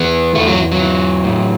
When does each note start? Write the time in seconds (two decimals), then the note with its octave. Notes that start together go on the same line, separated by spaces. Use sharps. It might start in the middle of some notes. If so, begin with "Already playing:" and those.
Already playing: E2 E3 B3
0.35 E2 A3
0.47 F#3
0.72 F#3
0.80 E3
1.24 A2